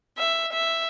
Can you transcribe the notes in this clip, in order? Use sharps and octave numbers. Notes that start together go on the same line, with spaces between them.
E5
E5